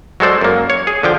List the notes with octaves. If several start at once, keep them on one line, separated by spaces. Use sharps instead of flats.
F#3 G#3 A4 C5 D5
F#2 A#3
C#5
G#4
D3 F3 G5